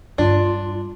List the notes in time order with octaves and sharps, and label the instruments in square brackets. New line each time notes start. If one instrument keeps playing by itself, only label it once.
[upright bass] G2 [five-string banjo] D4 [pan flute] F4